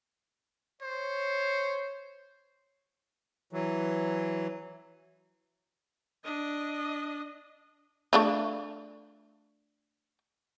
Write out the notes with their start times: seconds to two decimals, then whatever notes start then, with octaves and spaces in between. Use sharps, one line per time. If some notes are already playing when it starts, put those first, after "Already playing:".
0.82 C5 C#5
3.53 E3 F#3
6.25 D4 D#5
8.13 A3 D4 F4